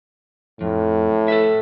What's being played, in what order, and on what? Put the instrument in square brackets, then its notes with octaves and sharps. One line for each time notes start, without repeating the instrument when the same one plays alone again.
[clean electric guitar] F2 [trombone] A2
[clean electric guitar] A4 B4 E5